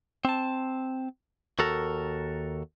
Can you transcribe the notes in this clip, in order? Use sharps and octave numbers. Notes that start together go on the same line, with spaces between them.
C4 A5
D#2 F#4 A4 A#4